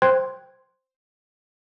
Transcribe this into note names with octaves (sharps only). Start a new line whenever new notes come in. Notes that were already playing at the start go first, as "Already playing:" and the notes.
C5 G5 C6 F#6 G#6